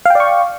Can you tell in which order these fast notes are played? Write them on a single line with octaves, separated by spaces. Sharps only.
F5 G5 D5 C#6